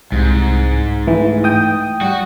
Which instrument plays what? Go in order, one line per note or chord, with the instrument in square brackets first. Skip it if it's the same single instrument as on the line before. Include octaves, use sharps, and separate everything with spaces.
[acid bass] C2 [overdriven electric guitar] G#2
[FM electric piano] E3 [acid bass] A3
[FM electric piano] G5 D#6
[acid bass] G3 [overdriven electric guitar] F#4